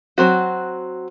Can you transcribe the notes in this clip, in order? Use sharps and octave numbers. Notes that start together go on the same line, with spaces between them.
F#3 C4 F#4